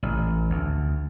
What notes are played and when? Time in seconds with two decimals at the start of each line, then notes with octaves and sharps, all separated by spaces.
0.03 A1
0.50 D2